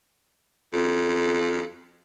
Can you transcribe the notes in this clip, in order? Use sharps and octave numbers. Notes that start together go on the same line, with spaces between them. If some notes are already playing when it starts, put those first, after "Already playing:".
F2